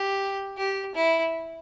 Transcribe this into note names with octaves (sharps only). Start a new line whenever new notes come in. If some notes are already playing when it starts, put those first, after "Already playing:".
Already playing: G4
G4
E4